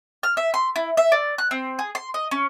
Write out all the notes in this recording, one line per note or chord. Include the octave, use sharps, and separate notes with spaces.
F6
E5
C6
E4
E5
D5
F#6
C4
G#4
C6
D#5
C#4